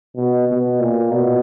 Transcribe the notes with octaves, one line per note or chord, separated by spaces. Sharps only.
B2
B2
A#2
B2